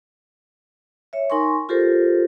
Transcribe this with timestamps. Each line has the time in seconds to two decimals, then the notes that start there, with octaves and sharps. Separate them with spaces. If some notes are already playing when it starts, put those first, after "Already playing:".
1.13 C#5 E5
1.30 D#4 A#4 G#5 C6 C#6
1.69 F4 G4 A4 A#4 C5